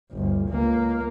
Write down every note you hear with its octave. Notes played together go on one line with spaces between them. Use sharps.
G1 D2
C#2 A#3